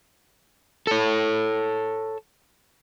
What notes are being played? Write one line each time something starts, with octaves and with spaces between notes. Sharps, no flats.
A4 C#5